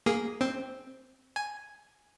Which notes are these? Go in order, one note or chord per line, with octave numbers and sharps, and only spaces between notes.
A#3 G#4
C4
G#5